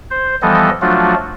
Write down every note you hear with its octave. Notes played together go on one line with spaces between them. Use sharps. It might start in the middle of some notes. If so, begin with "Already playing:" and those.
C5
E3 F3 G3 B3 A4 D#5
F3 F#3 A3 D4 F4 F#4